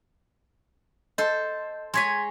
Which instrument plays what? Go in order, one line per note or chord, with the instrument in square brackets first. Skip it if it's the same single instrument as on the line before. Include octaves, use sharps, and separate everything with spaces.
[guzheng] A4 C5 [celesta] D#5
[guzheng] G#3 C#5 G#5 [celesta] C6 G#6 B6